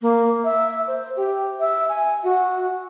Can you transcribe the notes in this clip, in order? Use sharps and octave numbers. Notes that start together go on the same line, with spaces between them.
A#3
E5
C5
G4
E5
G#5
F#4